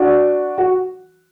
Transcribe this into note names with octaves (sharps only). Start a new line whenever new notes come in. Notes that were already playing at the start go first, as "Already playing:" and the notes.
Already playing: D4 F#4
F#4